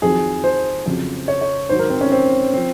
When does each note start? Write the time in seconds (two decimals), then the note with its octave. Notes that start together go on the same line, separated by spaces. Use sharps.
0.02 F2 D#3 F#3 G#4
0.44 C5
0.86 F2 C#3 F#3
1.28 C#5
1.41 C#5
1.69 G#2 D#3 F#3 C5
1.79 A#4
1.90 C4
2.01 C#4
2.12 C4
2.54 F3 C4